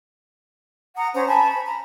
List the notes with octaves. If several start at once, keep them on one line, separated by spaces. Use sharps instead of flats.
F#5 A#5 D#6
C#4 C5 A#5
G#5 A5 B5
B5
A#5